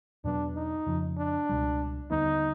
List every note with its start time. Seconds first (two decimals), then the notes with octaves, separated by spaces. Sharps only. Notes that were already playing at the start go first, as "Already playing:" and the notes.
0.24 E2 B2 F#3 B3 D4
0.56 D#4
0.86 F2 C#3 F3
1.18 D4
1.49 C#2 B2 G3
2.11 D#2 D3 G3 B3 D#4